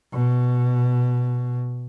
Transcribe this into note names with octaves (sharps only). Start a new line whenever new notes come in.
B2